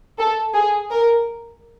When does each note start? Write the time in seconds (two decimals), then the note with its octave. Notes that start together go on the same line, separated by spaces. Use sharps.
0.19 A4
0.54 G#4
0.91 A#4